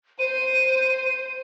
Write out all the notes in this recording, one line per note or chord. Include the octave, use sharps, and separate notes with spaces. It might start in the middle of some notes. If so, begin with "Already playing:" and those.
C5 D#7